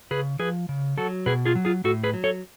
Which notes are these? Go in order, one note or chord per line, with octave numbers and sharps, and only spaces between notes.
C#3 G#4 B4
F3 G#4 B4
C#3
F#3 F#4 A4
B2 G#4 B4
F4 G#4
F#3
F4 G#4
A2 F#4 A4
G#4 B4
F#3
A4 C#5